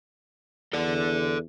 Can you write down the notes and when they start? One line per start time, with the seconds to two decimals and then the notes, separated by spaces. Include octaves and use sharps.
0.73 E2 A4 D5